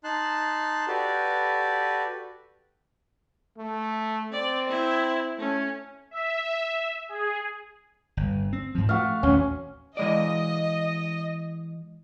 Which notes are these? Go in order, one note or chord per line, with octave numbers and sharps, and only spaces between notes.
D#4 A5 C6 F#6
F#4 G4 A4 B4 D5
A3
C4 D5
E4
A3 C#4
E5
G#4
G1
C4
G#2 F3
A3 F#4 F5
A1 D#2 C#4
E3 G#3 D5 D#5